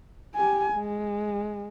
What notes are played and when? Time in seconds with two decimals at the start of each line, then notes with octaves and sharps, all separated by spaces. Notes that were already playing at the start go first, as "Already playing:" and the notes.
0.35 G4 G#5
0.74 G#3